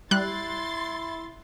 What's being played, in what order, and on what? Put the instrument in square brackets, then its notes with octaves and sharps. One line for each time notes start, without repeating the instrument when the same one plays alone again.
[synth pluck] G3 [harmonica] E4 [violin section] C6 A6 [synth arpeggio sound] F#6